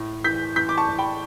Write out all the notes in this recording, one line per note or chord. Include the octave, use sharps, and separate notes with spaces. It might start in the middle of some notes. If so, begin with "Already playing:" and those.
Already playing: A2
E3 G6 B6
E3 G6 B6
D6
A5 C#6
A2
G5 B5